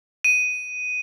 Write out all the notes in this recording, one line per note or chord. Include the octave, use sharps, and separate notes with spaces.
D#7